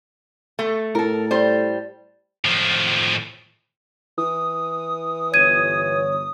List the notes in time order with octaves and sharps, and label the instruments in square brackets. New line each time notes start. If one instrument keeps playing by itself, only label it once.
[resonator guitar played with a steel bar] A3
[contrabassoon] A2 [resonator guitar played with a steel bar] A4 A#4
[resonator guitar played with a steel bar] G3 C5
[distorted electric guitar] A2 F3
[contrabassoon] E3 [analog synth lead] D#6
[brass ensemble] G1 C#5 [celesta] G#6 D#7